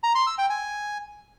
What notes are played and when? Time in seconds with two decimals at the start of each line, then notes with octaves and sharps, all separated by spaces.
0.03 A#5
0.15 C6
0.27 E6
0.38 G5
0.50 G#5